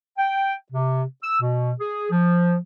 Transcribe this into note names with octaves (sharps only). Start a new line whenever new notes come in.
G5
C3
E6
B2
G#4
F3